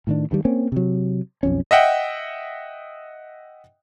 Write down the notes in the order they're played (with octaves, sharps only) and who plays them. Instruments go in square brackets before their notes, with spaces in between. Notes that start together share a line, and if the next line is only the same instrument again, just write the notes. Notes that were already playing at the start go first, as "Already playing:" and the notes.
[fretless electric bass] A2 D#3 D4
G2 D#3 G3
A#3 C4 C#4
C3 F#3
B1 F2 C#4
[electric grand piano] D#5 E5 F#5 G5